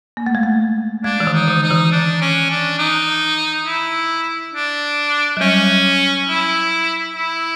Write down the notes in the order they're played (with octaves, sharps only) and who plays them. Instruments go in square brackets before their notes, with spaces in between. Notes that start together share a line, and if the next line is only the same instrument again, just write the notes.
[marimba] A#3
A3
G#3
A3
[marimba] G#3 [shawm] D4
[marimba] E3
D#3
[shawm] D#4
[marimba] D3
[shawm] D#4
[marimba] E3
[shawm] D4
C#4
D4
D#4
E4
D4
[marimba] F#3
[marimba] G3 [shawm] C#4
[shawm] E4
E4